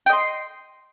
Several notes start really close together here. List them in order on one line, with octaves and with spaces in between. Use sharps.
G5 D#5 C6